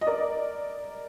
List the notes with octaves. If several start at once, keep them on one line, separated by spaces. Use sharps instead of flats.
D#5
A#4 D5